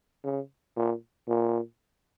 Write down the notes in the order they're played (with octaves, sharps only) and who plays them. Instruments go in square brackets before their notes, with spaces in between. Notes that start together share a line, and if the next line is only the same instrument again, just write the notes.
[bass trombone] C#3
A#2
A#2